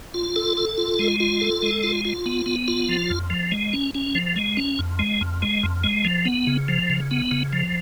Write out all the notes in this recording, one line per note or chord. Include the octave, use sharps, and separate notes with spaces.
F4
A4
A4
F4
G#3
F4
A4
G#3
F4
F4
B3
B3
F4
F3
F2
F3
G#3
C#4
C#4
F3
G#3
C#4
F2
G#3
F2
G#3
F2
G#3
F3
B3
C#3
F3
C#3
B3
C#3
F3